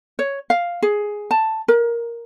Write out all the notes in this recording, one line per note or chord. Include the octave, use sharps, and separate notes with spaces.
C#5
F5
G#4
A5
A#4